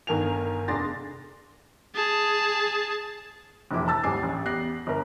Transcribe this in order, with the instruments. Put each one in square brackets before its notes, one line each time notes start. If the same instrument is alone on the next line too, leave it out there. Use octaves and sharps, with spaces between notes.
[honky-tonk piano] G1 D#3 A#4 G#5 F7
F1 D4 G#4 C6 A6 A#6
[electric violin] G#4 A5
[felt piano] F1 A#1 E3 E4 D6
A5 E6 A6
D#1 G#2 G3 G#5 D6 C7
A1
E2 G4 F#6 A#6 C7
G1 A#4